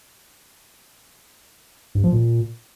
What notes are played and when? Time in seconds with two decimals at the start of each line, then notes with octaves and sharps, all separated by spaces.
1.95 G2
2.04 F3
2.12 A#2